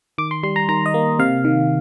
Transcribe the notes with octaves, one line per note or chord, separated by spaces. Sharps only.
D#3 D6
C6
G3 C6
A#5
D#3 A#5
D#5
A#3
C3 F5
D#3